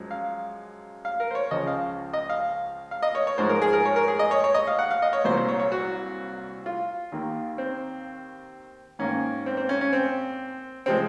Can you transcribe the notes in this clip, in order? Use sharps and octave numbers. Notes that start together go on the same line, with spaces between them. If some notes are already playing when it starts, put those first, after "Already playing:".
Already playing: F#2 F3 G#3
F5
F5
A#4
C5
C#5
C#2 C#3 F3 G#3 D#5
F5
D#5
F5
F5
D#5
C#5
C#5
G#2 F3 G#3 C5
A#4
G#4
A#4
C#5
A#4
G#4
D#5
C#5
C#5
D#5
F5
F#5
F5
D#5
C#5
C2 A#2 F#3 A#3 C5
C5
C#5
C#5
F#4
F4
D#2 D#3 A#3
C4
G#2 D#3 A#3 C#4
C4
C4
C#4
C#4
C4
C3 F3 G#3 C4